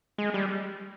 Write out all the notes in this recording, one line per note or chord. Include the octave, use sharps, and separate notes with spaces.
G#3
G3